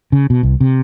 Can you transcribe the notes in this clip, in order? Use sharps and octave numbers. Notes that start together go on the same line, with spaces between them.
C#3
B2
C2
C3